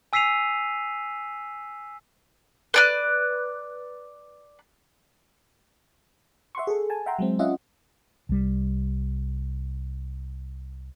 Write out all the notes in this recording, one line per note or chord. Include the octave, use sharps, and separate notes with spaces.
G#5 E6 B6 C7 D#7 F7
B4 D5 F#6
E5 F#5 C6 C#6
G#4 A4
G#5 A5
E5 F#5 G5 A#5 C6
F#3 G#3 C4
C#4 F4 D#5 E5 F#5
C2 G3